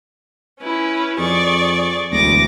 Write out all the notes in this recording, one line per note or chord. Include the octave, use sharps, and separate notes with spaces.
C#4 E4 B4
F2 G#4 D5 C#6
E1 D2 D6 A#6